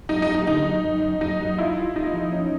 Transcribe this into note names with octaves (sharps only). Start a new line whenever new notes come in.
F#2 D#4
D#4
F#2
D#4
D3 D#4
F#3
F#2
F#2
F#2 D#4
F#3
E4 F4
F4
D#4 F4
F3
C#4